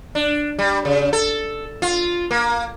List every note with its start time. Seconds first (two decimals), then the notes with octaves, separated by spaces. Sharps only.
0.15 D4
0.59 G3
0.85 C#3
1.13 A4
1.82 F4
2.31 A#3